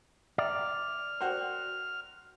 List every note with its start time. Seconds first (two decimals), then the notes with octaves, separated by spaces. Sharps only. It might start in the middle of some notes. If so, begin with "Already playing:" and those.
0.38 D5 E5 G5 A#5 F6
1.21 F#4 A#4 C5 G5